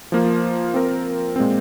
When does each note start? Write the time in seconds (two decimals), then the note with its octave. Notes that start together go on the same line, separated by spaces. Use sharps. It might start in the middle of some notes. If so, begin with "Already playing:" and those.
0.12 F3 A#3 F4
0.74 C4 F4 A#4
1.36 A#2 G#3 C4